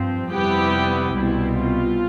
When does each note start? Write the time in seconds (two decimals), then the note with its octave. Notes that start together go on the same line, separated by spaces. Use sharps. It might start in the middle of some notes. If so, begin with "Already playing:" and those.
Already playing: G2 F3 C4
0.30 F2 C3 G3 B3 E4 G4
1.14 C2 B2 G3 C4 E4
1.57 F4